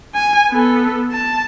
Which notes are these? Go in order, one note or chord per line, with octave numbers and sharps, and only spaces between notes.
G#5
B3 A4
A5